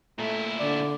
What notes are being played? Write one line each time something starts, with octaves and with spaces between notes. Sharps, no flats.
A#2 A3 E4
D3 D5